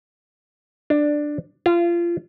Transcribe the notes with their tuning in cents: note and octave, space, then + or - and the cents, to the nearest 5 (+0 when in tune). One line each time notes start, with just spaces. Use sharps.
D4 +10
F4 -25